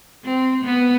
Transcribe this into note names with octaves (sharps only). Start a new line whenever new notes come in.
C4
B3